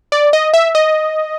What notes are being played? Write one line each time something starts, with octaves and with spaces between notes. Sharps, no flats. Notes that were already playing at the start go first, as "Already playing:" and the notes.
D5
D#5
E5
D#5